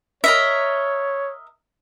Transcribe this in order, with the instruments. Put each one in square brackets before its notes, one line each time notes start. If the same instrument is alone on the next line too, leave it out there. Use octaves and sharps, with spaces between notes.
[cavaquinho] A#4 D#5 E5 [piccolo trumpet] C#5